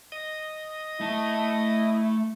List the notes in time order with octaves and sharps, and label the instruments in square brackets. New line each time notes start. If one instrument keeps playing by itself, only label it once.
[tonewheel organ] D#5 D#6
[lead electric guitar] A3 A5 [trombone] E4